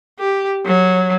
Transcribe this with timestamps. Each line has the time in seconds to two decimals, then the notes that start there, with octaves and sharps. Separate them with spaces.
0.19 G4
0.66 F#3